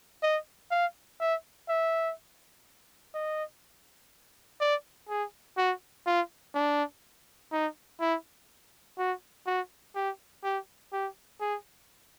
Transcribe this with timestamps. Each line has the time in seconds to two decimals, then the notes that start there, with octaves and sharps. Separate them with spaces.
0.23 D#5
0.71 F5
1.20 E5
1.69 E5
3.14 D#5
4.61 D5
5.09 G#4
5.58 F#4
6.07 F4
6.54 D4
7.52 D#4
8.00 E4
8.98 F#4
9.47 F#4
9.95 G4
10.44 G4
10.93 G4
11.41 G#4